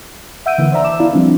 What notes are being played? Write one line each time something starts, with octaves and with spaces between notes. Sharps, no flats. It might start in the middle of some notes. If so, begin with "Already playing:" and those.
E5 F#5 E6 G6 D7 D#7
D3 E3 A#3
C5 D5 E5 A#5 E6
A5 D6 E7
B3 E4 D5 F5
F3 G3 B3 C4 D4